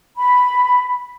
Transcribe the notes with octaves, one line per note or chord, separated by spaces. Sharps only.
B5